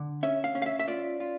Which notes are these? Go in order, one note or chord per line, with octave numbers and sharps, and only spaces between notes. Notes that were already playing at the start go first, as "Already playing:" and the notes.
Already playing: D3
C#4 E5
F5
C#4
F5
E5
E5
F4 D5
F4